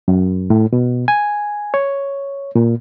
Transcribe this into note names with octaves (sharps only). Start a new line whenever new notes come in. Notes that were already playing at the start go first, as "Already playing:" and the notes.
F#2
A2
B2
G#5
C#5
A#2